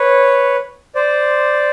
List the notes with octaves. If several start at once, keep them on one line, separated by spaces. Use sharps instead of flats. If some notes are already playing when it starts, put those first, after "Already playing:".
Already playing: B4 C#5
C5 D5